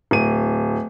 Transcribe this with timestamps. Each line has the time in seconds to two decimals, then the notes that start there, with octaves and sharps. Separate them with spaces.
0.11 D1 D#7